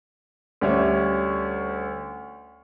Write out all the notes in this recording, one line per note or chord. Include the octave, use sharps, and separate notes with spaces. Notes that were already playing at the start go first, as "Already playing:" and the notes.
D2 G3 C#4 E5